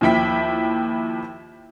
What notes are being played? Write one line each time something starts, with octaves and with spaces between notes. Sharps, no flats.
D#2 F3 E4 G5 B6